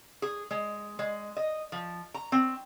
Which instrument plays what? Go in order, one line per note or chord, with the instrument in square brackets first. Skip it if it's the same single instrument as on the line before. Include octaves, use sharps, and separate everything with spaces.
[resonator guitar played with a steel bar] G#4
G#3
G#3
D#5
F3
A#5
C4